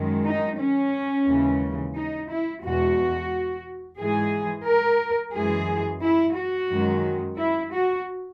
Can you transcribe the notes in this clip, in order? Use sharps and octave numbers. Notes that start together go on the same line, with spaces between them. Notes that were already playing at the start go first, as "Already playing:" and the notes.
Already playing: F#2 D#3 G#3
D#4
C#4
D#2 C#3 E3 G#3
D#4
E4
E2 B2 G#3 F#4
G#2 E3 G#3 G#4
A#4
F#2 E3 G#3 G#4
E4
F#4
F#2 D#3 G#3
E4
F#4